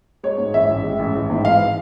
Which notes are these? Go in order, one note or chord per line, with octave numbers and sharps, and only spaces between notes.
G#3 C#5
G#2
A1 E5
A1
G#3
A1
A1
G#2
E3 F5